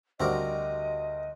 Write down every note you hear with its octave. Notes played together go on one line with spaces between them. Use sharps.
D2 G3 C4 F#4 A#4 D#5 D6